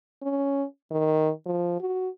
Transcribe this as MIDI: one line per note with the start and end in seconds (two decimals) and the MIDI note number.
0.22 0.64 61
0.91 1.30 51
1.46 1.76 53
1.80 2.08 66